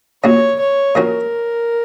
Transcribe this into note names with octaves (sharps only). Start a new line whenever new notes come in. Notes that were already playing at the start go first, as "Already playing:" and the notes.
A#2 A#3 C#4 F#4 C#5
C#5
A#2 A#3 C#4 F#4 A#4